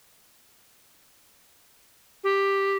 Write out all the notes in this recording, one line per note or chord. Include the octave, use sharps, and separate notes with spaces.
G4